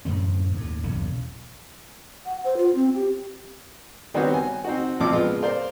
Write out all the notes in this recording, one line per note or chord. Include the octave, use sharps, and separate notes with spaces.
F#2 A2 D3 C4
D#2 A2
B1 E2 G2 C#3
F#5
C5
F4
C4
G4
D#3 G3 B3 C4 F#4 C#5
G#5
C4 D#4 F#4
A1 A#2 F3 C4 D6
G#3 B3 F4
A#4 C5 D5 F5